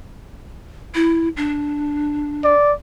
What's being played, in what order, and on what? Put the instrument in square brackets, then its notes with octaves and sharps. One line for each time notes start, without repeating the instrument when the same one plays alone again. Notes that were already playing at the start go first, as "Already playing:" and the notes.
[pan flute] E4
D4
[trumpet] D5